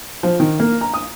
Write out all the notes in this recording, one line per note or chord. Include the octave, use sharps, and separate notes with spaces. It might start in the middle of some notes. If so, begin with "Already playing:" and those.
F3
D#3
A#3
A#5
D#6